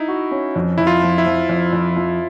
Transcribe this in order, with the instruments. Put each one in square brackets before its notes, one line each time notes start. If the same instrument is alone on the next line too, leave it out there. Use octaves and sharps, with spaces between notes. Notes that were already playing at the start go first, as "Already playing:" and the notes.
Already playing: [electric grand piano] D#4 E4
[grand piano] F#4
C#4
F2
[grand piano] F2 [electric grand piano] E4
[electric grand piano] F4
[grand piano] F3
[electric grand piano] E4
[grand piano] F3
F2
F2
F3